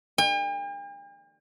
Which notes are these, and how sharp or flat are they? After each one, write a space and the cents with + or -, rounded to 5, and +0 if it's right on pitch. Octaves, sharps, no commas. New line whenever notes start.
G5 +45